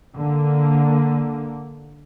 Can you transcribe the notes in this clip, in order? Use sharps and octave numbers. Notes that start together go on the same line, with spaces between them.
D3 A#3